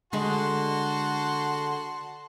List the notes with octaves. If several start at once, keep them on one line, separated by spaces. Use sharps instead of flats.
D3 G#3 F#4 A5 C6